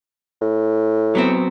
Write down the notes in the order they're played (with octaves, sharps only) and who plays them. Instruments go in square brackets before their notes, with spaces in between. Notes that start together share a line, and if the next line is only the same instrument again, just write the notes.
[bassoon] A2
[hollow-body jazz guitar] F#3 B3 C4